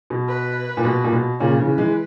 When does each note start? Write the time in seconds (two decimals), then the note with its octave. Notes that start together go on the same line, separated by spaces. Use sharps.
0.10 B2
0.28 B4
0.77 A#2
0.84 B2
1.04 A#2
1.12 B2
1.40 A#2 C#3 C#5
1.59 C#3 E3
1.68 B4
1.78 E3 G#3